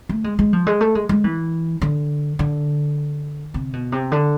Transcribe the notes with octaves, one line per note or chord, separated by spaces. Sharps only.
A3
G#3
G#3
F3
G#3
A3
G#3
G#3
E3
D3
D3
C3
B2
C3
D3